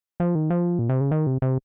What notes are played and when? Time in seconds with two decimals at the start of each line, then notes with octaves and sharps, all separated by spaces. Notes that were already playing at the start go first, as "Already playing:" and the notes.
0.20 F3
0.35 D#3
0.50 F3
0.79 A#2
0.89 C3
1.01 C#3
1.11 D#3
1.27 C3
1.42 C3